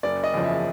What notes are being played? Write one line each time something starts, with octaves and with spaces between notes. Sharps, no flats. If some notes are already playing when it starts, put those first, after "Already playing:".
F#1 D5
D#5
E2 C#3 F3
E5